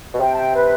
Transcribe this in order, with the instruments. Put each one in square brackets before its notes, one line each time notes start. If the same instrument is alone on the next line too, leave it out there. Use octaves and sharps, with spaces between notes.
[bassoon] B2
[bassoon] C3 [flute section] G5
[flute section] A5
G5
B4